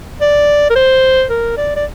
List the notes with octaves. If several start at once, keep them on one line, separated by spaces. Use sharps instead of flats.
D5
A#4
C5
A#4
D5
D5